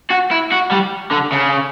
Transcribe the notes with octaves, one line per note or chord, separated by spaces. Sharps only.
F#4
E4
F#4
G3
D3
C#3